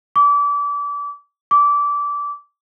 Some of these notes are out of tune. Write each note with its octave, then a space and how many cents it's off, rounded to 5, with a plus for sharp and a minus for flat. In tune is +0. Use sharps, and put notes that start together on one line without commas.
D6 -30
D6 -20